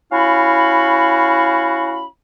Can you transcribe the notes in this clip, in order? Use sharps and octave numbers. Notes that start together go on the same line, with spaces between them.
C#4 E4 F#4 F5 B5